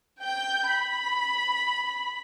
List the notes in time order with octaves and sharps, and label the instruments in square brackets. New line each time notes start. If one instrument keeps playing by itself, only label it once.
[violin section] G5 G6
B5